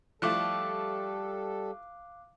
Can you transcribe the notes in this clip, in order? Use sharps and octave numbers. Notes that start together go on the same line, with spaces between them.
F3 G3 A3 E4 A4 F5 D6 F#6